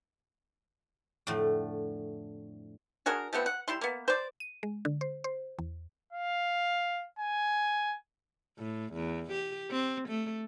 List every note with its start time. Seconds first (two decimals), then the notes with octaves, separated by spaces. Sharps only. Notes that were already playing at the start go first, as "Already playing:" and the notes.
1.27 F2 A2 D3 A3
3.06 D4 F#4 G#4 A#4
3.33 F3 A3 B3 C4
3.46 F#5
3.68 G3 E4 C6
3.81 A#3 B3
4.08 C5 D5
4.40 D#7
4.63 G#3
4.85 D3
5.01 C5
5.24 C5
5.59 E2
6.12 F5
7.19 G#5
8.58 A2
8.93 E2
9.32 G4
9.70 C4
10.09 A3